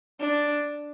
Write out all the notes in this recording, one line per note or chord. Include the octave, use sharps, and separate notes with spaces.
D4